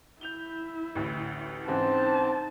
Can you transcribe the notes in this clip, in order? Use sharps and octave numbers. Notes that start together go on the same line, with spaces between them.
E4 G6 F7 G7
A1 D2
G#2 C#3 E3 C4 D#4 A5